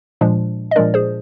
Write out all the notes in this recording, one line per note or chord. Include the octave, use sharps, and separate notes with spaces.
A#2 F3 G#3 D4
D#5
A#2 F3 G#3 D4 A#4 D5
G#4 C5